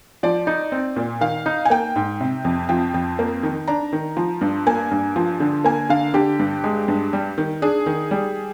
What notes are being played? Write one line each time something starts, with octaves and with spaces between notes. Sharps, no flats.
F3 D5
D#4
C4
A#2
D#3 F5
D#4
G#5
A#3 G5
G#2
C3
F2
F3 G5
F2
A#3
D#3
D4 A#5
D#3
F3
G2
A#3 G#5
G2
F3
D3
A#3 G#5
D3 F5
D3 G4
G2
G#3
G2
G3
D#3
D4 G#4
D#3
G3